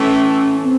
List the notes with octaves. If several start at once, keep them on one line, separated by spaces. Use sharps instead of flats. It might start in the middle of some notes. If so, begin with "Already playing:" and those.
Already playing: A2 E3 A3 C#4
C4